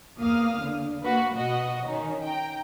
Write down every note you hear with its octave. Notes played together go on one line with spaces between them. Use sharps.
E2 A#3 F5 D#6 F6
D3
A#3 F#4 B4
B2 F#4 D#5
D#3 C#4 D#4
G5 A#5